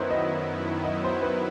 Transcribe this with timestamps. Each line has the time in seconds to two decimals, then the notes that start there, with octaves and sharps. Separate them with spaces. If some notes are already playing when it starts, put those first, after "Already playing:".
Already playing: F#2 D#3 F#3 B3 E4 B4 C5
0.10 D#5
0.85 D#5
1.04 C5
1.22 B4